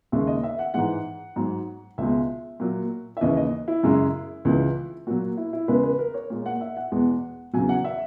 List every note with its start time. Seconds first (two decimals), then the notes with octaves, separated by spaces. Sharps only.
0.12 D#2 C#3 G#3 E5
0.27 D#5
0.43 E5
0.59 F#5
0.74 G#2 E3 G#3 F#5
1.36 G#2 F#3
1.98 C#2 B2 G#3 E5
2.60 A#2 F#3
3.17 E5
3.21 D#2 C#3 E3 D#5
3.37 D#5
3.68 E4
3.83 F#2 C#3 G#3
4.45 C#2 C#3 E3
5.07 A#2 F#3 F#4
5.37 E4
5.53 E4
5.68 E2 C#3 G#3 B4
5.83 B4
5.99 A#4
6.14 C#5
6.30 A#2 G#3
6.46 F#5
6.61 E5
6.77 F#5
6.92 E2 B2 G#3
7.53 E2 C#3 F#3 G#5
7.69 F#5
7.85 E5